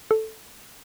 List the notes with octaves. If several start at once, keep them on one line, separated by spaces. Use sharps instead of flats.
A4